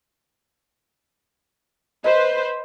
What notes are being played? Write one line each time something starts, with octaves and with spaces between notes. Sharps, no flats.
B4 C5 D#5